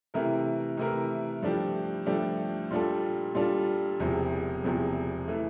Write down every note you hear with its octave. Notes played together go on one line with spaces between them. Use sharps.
C3 E3 A3 E4 A#4
C3 E3 A3 E4 A#4
G2 F3 A3 D4 G4
G2 F3 A3 D4 G4
A#2 G3 D4 F4 A4
A#2 G3 D4 F4 A4
E1 E2 C3 F3
E1 E2 C3 F3
E3 A3